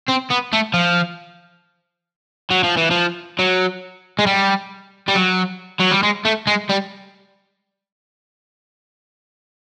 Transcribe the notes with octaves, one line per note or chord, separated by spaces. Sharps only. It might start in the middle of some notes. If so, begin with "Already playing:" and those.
C4
B3
A3
F3
F#3
F3
E3
F3
F#3
G#3
G3
G3
F#3
F#3
G3
G#3
A3
G#3
G3